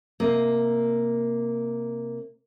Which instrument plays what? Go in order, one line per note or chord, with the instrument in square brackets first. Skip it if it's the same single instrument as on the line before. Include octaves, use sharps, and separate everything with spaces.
[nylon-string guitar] C3 A#3 D#5